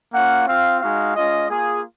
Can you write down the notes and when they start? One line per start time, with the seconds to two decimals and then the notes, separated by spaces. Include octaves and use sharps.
0.13 A#3 C#4 F4 F#5
0.48 C4 F4 F5
0.81 G#3 D#4 F#4 F5
1.15 G#3 C#4 F4 D#5
1.50 A#3 F4 G#4